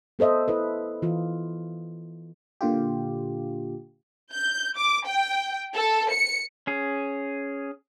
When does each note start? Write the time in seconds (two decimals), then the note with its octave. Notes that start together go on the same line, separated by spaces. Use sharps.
0.19 B3 A4 C5 D#5 E5
0.48 E4 A4 B4
1.02 E3 F4
2.61 A#2 D3 F4 G4
4.33 G6
4.76 D6
5.07 G5
5.74 A4
6.11 C#7
6.67 C#4 G#4